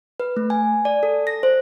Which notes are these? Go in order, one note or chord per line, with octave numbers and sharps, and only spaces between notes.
B4
A3
G#5
D5
A4
A#6
C5